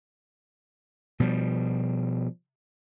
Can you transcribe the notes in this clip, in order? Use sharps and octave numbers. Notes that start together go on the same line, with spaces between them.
B2 F3 G3